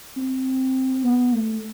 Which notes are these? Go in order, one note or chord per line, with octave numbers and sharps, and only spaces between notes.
C4
B3
A3